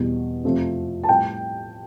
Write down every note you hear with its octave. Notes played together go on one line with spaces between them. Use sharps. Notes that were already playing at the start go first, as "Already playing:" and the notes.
Already playing: E2 B2 G3
F2 C3 F3 A3
A5
A2 G3 G5